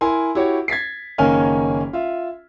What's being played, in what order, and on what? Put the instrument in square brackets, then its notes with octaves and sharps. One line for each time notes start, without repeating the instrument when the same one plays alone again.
[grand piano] E4 A#4 G#5 C6
E4 F#4 G4 C#5
G#6 A6 B6 C7
F#1 D#3 A#3 C#4 G#5 F6
F4 E5